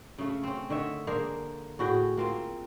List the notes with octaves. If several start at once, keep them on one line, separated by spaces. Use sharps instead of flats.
C#3 A3
C4 C#4
D3 D#3 C#5 E5
A#3 D4 G#4 C5
A2 F#4 G#4 G5
A#3 C4 F4